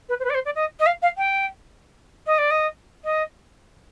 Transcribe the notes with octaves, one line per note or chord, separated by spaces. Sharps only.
B4
C5
B4
D5
C5
D5
D#5
D#5
F5
F5
G5
D#5
D5
D#5
D#5